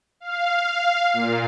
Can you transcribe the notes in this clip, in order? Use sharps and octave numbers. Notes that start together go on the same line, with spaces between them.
F5
A#2